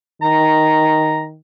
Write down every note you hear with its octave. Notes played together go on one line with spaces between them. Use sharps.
D#3 A#5